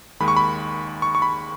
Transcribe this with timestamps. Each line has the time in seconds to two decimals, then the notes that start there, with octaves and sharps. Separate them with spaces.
0.20 D#2 D#3 G#3 B5
0.28 C#6
0.37 B5
1.02 C#6
1.15 C#6
1.22 B5